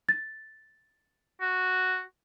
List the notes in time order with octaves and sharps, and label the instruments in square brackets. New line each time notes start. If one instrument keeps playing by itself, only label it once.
[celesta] A6
[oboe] F#4